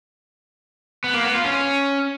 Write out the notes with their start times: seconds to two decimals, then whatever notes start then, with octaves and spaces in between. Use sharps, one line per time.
1.04 B3
1.14 A#3
1.24 B3
1.35 F4
1.45 C#4